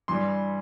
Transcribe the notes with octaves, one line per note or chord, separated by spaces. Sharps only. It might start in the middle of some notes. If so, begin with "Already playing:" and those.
G2 E3 G3 C6